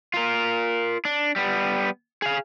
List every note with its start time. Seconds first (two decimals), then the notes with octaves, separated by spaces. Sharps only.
0.14 F4 A#4
1.05 D4
1.36 G3 B3
2.22 G#4 F5